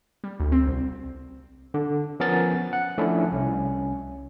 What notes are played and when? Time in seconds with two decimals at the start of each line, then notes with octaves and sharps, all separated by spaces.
0.24 G3
0.40 D2
0.52 C4
0.67 C2
1.74 D3
2.20 F3 B3 C#4 A#4 A6
2.73 F#5
2.98 F3 A3 C#4 D4 E4
3.32 C2 C#4